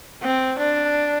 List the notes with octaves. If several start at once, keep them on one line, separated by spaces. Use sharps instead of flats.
C4
D4